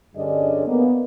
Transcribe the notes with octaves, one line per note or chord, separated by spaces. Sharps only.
G2 D3 C#4 G#4 D5 D#5
A#3 B3